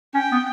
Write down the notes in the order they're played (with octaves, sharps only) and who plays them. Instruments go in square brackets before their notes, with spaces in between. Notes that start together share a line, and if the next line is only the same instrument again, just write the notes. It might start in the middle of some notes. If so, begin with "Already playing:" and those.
[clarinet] C#4 [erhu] G5
[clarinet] B3